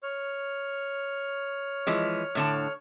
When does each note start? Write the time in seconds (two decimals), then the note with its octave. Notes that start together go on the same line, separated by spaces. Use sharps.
0.03 C#5 F6
1.87 E3 F3 G#3
2.35 A2 D3 A5